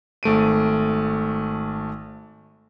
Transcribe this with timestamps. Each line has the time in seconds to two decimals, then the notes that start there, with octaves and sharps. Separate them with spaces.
0.23 G#1 A3 D7 D#7